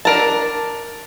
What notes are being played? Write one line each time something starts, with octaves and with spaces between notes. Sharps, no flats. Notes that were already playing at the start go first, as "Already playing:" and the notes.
D4 A#4 A5